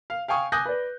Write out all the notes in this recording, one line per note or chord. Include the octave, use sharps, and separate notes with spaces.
F5
F5 G5 G#5 C#6 D#6
G#5 D6 D#6 F#6 G6 A#6
B4 D5